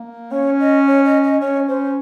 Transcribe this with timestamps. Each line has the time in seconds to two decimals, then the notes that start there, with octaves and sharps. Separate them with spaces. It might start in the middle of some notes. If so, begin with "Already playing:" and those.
Already playing: A#3
0.31 C#4 C#5
0.59 D#5
0.87 C#5
1.05 D#5
1.23 D#5
1.40 C#4 C#5
1.68 C#4 C5